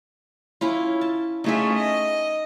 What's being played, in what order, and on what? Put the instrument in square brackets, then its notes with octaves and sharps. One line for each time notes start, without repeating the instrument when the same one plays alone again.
[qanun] C#4 E4 F4
A5
[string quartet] A3 C#4 F4 [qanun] D#4 G#4 E5
[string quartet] D#5